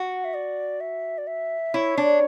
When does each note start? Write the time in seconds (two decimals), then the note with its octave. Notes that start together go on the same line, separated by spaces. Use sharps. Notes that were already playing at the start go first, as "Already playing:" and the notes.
Already playing: F#4 F#5
0.25 E5
0.34 D5
0.81 E5
1.18 D5
1.27 E5
1.74 E4 C#5
1.97 D4